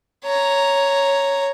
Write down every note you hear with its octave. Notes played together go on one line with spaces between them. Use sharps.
C#5 A#5